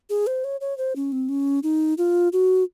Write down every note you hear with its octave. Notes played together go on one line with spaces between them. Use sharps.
G#4
C5
C#5
C#5
C5
C#4
C4
C#4
D#4
F4
F#4